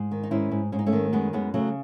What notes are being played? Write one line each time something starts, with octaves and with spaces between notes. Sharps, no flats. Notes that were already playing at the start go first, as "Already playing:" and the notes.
Already playing: G#2
D#3
D#4
G#2 C#4 E4
G#2
G#2 C#4
D#4
A3 C#4
D#3
F#2 G#3 B3
F#2 G#3 B3
C#3 F#3 A3